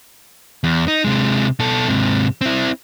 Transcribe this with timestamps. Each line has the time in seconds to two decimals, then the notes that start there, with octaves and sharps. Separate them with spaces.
0.64 E2
0.88 D#4
1.05 C3 G#3
1.59 B2 A4
1.88 G#2 C3
2.41 C4 E4